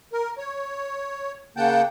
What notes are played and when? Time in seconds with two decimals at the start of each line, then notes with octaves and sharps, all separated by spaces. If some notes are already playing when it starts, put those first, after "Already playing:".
0.13 A#4
0.38 C#5
1.57 C#3 A#3 F#5 G5 A5 G6